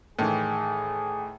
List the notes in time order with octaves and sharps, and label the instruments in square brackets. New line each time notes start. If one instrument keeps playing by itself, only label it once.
[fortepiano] A2 D#3 E3 [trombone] G#4